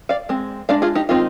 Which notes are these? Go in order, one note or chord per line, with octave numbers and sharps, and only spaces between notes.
D5 F5
G#3 C4
G#3 D4 D5 F5
F4 G#4
D#4 G4
D#3 G#3 C4 D#4 F4